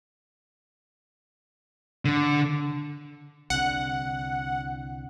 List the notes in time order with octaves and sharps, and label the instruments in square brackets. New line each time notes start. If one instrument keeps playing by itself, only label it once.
[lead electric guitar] D3
[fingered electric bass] C2 D3 [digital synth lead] F#5